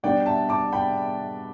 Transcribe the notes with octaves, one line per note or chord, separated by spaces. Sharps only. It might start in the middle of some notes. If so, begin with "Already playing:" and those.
B2 G3 B3 D4 D5 G5
E5 A5
A5 D6
G5 B5